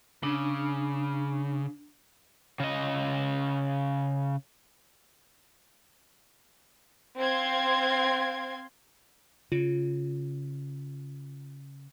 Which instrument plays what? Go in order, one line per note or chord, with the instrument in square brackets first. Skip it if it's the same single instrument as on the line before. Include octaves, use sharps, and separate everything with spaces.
[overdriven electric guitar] C#3 [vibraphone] D4
[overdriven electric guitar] C#3 D#5
[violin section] C4 F5 C6 G#6
[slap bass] C#3 [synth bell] F4